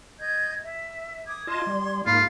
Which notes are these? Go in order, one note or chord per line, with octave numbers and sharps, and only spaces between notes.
D#5 G6 G#6
E5
D6 D#6 G#6
F4 D#5 A5 C6 G#6
G3
G#2 A#3 F4 B5